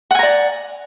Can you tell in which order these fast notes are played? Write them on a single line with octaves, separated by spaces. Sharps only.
F#5 G#5 A#5 D5